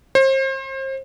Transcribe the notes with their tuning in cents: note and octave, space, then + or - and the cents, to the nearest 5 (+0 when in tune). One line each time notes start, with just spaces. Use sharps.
C5 +35